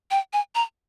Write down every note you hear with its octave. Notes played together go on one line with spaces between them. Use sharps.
G5
G#5
A#5